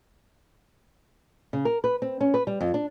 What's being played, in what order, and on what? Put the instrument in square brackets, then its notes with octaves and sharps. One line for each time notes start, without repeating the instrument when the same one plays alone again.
[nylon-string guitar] C#3
A#4
B4
C4
C#4
B4
G3
F2
D4